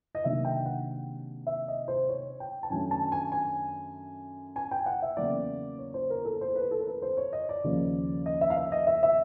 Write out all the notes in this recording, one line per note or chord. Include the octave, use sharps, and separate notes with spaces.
D#5
C3 D#3 F#3 A#3 D4 E5
G5
F#5
E5
D#5
C5
C#5
G5
A5
F#2 D#3 F#3 A3 D4 G#5
A5
G#5
G#5
G#5
G5
F#5
E5
E2 C#3 F#3 A#3 D5
C#5
C5
A#4
A4
C5
B4
A4
A#4
B4
C5
C#5
D#5
D5
D#2 C#3 F3 A#3
D#5
E5
F5
E5
D#5
E5
E5